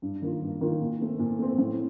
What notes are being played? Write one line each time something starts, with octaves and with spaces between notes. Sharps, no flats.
G2
D#3 A#3 F4
G2
D#3 A#3 F4
A#2
A3 C4
A#2
A3 C4
A2